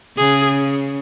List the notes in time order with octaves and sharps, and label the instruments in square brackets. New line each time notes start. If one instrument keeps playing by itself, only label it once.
[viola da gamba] C#3 [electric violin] G#4